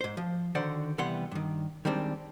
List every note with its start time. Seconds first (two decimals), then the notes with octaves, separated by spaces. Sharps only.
0.01 G#2 C5
0.17 F3
0.55 D3 D#3 F#4 C5 D5 F#5
0.98 C3 E3 G3 B3 F#5 C6
1.31 G2 D#3
1.85 D#3 G3 G#3 C4 D4